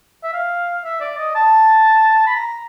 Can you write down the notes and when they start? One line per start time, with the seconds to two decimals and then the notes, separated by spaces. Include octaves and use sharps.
0.24 E5
0.33 F5
0.84 E5
1.00 D5
1.18 D#5
1.35 A5
2.27 B5
2.36 A#5